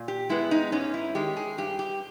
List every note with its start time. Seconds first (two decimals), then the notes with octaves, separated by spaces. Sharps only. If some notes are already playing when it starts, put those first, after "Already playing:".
Already playing: A#2
0.08 G4
0.30 G#3 B3 E4
0.51 D#4
0.72 G#2 C#4
0.94 E4
1.15 D#3 G#3 G4
1.37 G#4
1.58 G2 G4
1.79 G4